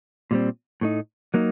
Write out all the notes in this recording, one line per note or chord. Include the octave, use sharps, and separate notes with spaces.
A#2 G3 C4
A2 A3 D#4
F#3 A#3 D#4